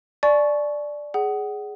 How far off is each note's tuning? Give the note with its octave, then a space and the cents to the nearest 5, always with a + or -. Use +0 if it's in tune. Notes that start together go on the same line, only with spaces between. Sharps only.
D5 +0 G#5 +45 C#6 +0
G#4 +5 F#5 +25